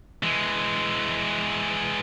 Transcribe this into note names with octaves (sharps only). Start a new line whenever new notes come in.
E3 G#3